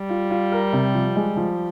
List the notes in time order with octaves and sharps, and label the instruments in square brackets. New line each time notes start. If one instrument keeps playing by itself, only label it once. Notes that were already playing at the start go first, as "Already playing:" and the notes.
Already playing: [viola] G3
[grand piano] F4
F4
A#4
C3
F3
G#3
F3